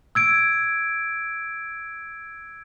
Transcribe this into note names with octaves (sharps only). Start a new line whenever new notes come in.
E6 G#6 D7